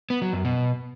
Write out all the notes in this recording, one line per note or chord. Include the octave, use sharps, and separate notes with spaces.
B3
F#3
F#2
B2